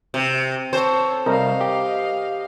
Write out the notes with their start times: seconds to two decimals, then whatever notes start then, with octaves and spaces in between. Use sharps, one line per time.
0.14 C3
0.73 A4 C5 C#5
1.26 C3 G3 A#4 D#5 F5
1.61 G4